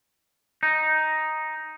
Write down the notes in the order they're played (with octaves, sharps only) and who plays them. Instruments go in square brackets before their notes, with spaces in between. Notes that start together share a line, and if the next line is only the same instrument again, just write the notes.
[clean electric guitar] D#4